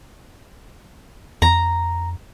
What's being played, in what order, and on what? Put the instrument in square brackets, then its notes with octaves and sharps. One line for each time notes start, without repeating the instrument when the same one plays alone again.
[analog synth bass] F2 [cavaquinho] A#5